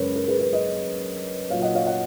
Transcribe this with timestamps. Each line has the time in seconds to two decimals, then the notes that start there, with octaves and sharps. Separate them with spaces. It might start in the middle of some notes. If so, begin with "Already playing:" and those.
Already playing: F#2 C#3 G#3 A#4 B4 C#5
0.16 A#4
0.28 G#4 B4
0.40 G#4 B4
0.53 B4 D#5
1.50 A#2 F#3 A#3 C#5 F5
1.62 D#5 F#5
1.75 C#5 F5
1.86 D#5 F#5